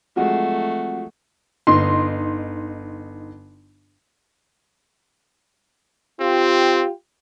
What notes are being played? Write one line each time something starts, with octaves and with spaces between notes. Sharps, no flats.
F3 F#3 G#3 A3 C4 F#4 F#5
G1 D#4 C6
C4 F4 G4